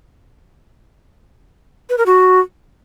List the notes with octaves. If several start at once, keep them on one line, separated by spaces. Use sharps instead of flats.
B4
A#4
F#4